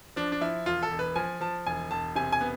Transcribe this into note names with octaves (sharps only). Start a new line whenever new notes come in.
F3 D4
D4
F3 E4
E1 F4
A4
E1
B4
F3 G#5
F3 A5
E1 G#5
E1 A5
C3 G#5
G#5
B3